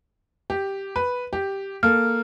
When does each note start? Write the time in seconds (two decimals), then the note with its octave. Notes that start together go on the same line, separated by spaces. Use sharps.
0.50 G4
0.96 B4
1.33 G4
1.83 A#3 A4 F6